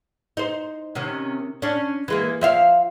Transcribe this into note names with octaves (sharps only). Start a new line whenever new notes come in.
D#4 C5
C3 D#3 C#4
C#4 D4
E3 G#3 A#3
F3 E5 F5